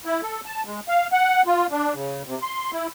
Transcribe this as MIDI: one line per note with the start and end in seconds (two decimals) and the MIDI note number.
0.05 0.21 64
0.23 0.40 69
0.46 0.63 81
0.66 0.80 56
0.88 1.07 77
1.12 1.42 78
1.46 1.67 65
1.72 1.94 62
1.94 2.23 49
2.26 2.38 48
2.42 2.71 84
2.72 2.87 64